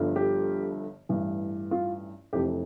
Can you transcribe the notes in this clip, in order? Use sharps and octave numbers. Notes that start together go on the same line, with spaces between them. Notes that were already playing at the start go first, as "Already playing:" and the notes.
Already playing: G1 G2 D3 F3
G4
A1 G2 E3
F4
F1 F2 E3 G4